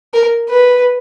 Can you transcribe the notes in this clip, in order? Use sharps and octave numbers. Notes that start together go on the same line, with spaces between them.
A#4
B4